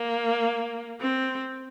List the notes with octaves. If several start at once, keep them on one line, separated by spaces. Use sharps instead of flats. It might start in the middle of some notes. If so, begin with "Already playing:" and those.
Already playing: A#3
C4